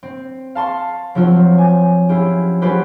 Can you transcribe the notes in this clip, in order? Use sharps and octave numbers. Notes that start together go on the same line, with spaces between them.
C4
F5 A5 C6 C#6
F3 F#3 C4 F4 C5
G#5
C#4 E4 F4 G4
F#3 C#4 F4 G4 B4 C5